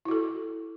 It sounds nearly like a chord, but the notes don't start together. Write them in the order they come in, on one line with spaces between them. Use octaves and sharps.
E4 F#4 A4